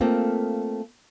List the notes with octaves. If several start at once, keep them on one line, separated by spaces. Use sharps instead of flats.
A3 A#3 C4 F4